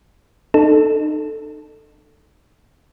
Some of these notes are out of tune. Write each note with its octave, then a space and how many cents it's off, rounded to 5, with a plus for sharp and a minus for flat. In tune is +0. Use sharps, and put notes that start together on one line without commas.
D#4 -35 A4 +0